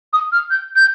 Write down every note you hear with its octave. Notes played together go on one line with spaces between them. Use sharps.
D#6
F6
G6
G6